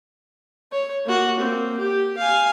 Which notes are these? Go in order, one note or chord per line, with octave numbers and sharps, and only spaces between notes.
C#5
A#3 F#4
A#3 C4
G4
F5 G#5